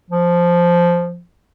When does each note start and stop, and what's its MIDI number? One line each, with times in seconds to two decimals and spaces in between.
0.10 1.21 53